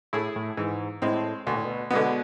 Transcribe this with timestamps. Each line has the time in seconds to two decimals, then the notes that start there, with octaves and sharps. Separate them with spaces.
0.13 A2 A3 E4 G#4
0.36 A2
0.57 G#2 E3
1.02 A2 G#3 C4
1.47 D2 B2
1.56 A2
1.65 B2
1.91 B2 D3 G#3 B3